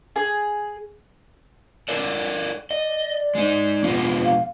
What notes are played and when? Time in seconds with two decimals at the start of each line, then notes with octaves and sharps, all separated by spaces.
0.16 G#4
1.89 A4 A#4 D5
2.71 D5 D#5
3.35 G#3 D#4
3.83 B2 F3 G#3
4.24 F5